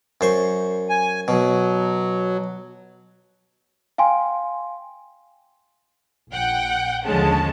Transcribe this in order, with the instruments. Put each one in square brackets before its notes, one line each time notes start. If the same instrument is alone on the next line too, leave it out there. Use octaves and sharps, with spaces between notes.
[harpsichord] F#2 C5 C#6
[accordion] G#5
[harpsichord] B2 [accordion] F#3
[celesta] F5 G5 G#5 C6
[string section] A#1 F#5 G5
D#2 D3 F3 G#3 C#4 A5